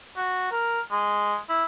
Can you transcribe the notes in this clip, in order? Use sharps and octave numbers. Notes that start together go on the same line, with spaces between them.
F#4
A#4
G#3
E4